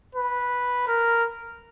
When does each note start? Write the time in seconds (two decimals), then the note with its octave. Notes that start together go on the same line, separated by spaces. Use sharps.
0.15 B4
0.87 A#4